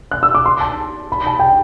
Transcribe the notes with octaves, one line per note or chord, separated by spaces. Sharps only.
F#6
E6
D6
C6
A5
B5
A5
G5